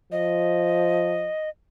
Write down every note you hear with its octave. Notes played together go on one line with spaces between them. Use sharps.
F3 D#5